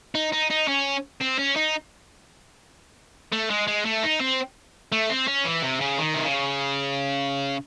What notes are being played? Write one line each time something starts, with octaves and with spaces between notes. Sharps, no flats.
D#4
D#4
D#4
C#4
C4
C#4
D#4
A3
G#3
G#3
A3
D#4
C4
A3
C4
C#4
E3
C3
C#3
D#3
C3
C#3